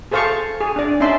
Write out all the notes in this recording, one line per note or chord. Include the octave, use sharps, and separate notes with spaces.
G#4 A4 C5 F5 A5 C#6
G#4
D4 D5
C#4 D#4 E5 A5 C6